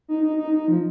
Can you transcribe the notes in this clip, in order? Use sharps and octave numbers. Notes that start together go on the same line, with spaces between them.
D#4
D#4
D#4
D#4
F3